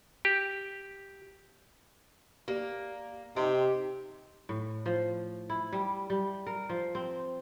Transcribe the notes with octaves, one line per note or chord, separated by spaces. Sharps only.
G4
A#3 G4 D5
C3 D#4 G4 D#5
A2
F3
E4
G3
G3
A#4
F3
C4